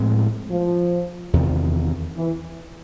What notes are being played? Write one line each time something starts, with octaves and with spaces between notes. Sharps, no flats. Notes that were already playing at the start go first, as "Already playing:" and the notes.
Already playing: A2 F3 G#3 C4
F3
E2 C3 D#3
E3